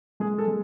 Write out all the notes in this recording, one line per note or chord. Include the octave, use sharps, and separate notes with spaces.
G#3 G#4
A4
G#3